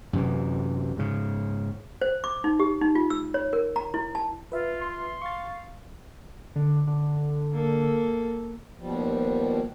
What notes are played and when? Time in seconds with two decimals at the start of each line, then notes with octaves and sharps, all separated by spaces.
0.13 F#2 C3 E3
0.97 G#2 C#3
2.02 C5
2.24 D6
2.44 D#4
2.60 G4
2.81 D#4
2.95 F4
3.10 E6
3.34 C#5
3.53 A#4
3.76 A#5
3.94 E4
4.15 A5
4.52 F4 B4 E5
4.81 C6
5.22 F5 C#6 A6
6.56 D3
6.87 D3
7.53 A#3 A4
8.78 D#2 B2 F3 G3